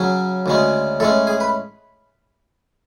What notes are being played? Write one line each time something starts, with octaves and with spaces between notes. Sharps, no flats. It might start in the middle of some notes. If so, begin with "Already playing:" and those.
Already playing: C#3 F#3 C#4
D2 C#3 G#3 C#4
A2 G#3 C#4 A4
G#4
B4